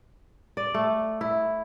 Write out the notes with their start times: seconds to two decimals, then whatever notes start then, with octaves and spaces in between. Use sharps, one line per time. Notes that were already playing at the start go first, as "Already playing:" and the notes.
0.57 D5
0.74 A3
1.21 E4